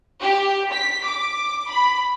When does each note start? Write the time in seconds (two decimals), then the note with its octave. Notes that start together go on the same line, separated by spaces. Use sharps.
0.21 G4
0.73 B6
1.05 D6
1.69 B5